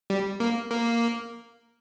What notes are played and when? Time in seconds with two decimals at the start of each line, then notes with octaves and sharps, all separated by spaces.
0.10 G3
0.40 A#3
0.71 A#3